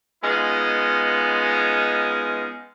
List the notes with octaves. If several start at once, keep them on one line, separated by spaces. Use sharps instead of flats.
G#3 B3 C#4 D#4 F4